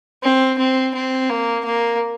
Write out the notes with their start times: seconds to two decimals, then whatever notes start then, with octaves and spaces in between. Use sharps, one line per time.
0.23 C4
0.58 C4
0.94 C4
1.30 A#3
1.65 A#3